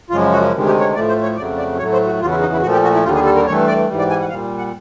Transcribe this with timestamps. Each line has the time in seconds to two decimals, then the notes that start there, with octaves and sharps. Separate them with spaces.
0.10 F#2 C#3 F3 G#3 F4
0.32 F#4
0.53 D2 C3 D#3 G#3
0.66 G4
0.80 C#5
0.95 A2 F3 A3 D5
1.09 C5
1.23 C#5
1.36 F2 C#3 F#3 A3 D5
1.57 D5
1.78 A2 F#3 A3 C#5
1.93 C5
2.06 F#4
2.20 E2 C#3 F#3 F4
2.31 E4
2.42 D#4
2.53 E4
2.62 A#2 F3 A3 F#4
2.73 G4
2.84 F#4
2.94 E4
3.04 D#2 D3 G3 F4
3.15 G#4
3.26 A4
3.36 A#4
3.46 G2 E3 A3 C#5
3.67 D5
3.88 G#2 E3 G3
3.99 D5
4.10 G#5
4.20 F#5
4.30 A#2 G3 F5
4.58 F#5